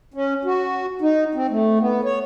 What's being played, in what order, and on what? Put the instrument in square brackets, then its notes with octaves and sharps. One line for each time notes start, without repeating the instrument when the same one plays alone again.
[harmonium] C#4
F#4
D#4
C4
A3
B3
C#5